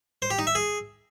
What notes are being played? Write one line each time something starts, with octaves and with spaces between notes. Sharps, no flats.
C5
G4
D#4
E5
G#4